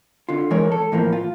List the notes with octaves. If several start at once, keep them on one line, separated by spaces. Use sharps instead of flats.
D3 F4
E3 G#3 A#4 C#5
A4
A2 E3 F3 A#3
F4